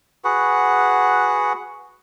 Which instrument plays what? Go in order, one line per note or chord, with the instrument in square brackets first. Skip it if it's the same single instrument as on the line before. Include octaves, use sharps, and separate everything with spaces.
[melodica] F#4 G#4 B4 F#5